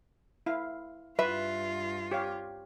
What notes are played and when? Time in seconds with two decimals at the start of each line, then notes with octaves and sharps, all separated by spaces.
0.46 E4 F5
1.19 G2 F4 B4 E5
2.11 G4 C#5 F5